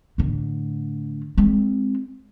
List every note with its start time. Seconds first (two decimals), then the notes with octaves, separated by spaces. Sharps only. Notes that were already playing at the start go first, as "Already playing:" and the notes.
0.18 A2 D3
1.38 G#3 C4